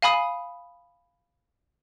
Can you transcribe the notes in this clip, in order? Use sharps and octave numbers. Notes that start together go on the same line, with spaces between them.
F5 G#5 B5 D#6